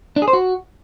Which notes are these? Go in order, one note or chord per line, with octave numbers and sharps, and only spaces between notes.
D4
G#4
C5
F#4